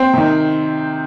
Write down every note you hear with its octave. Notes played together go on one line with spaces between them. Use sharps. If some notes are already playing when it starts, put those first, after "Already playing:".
Already playing: C4
C3 D#3